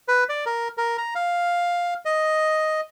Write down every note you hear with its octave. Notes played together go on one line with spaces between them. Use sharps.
B4
D5
A#4
A#4
A#5
F5
D#5